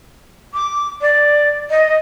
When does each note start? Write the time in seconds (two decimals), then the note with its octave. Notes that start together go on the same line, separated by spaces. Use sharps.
0.54 D6
1.02 D5
1.70 D#5